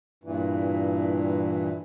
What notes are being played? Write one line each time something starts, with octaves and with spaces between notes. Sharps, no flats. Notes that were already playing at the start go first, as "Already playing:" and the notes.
G2 A#2 E3